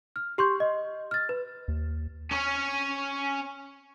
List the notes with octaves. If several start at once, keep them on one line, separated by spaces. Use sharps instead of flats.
F6
G4 C6 C#6 G6
D#5
F6 A6
B4
D#2
C#4 C#5